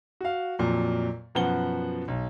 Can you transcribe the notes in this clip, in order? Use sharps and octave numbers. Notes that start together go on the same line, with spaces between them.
F#4 F5
F2 A#2 F#3
F#2 B2 F3 B4 F#5 G7
B1